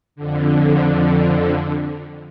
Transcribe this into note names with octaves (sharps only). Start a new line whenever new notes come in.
F2 D3